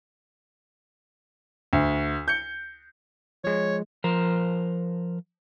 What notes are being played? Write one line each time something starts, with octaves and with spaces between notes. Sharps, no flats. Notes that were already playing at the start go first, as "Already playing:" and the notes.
D2
G6 C#7
F3 G#3 C#5
F3 A#4 C5